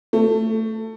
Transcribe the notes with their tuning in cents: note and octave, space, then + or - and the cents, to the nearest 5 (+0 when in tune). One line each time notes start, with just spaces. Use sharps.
A3 +15